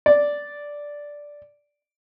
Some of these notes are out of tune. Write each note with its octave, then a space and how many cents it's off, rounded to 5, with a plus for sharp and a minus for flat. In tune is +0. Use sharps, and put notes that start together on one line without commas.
D5 -5